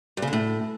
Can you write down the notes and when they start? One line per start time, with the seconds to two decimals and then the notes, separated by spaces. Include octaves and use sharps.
0.17 G2
0.22 C#3
0.28 D3
0.33 A2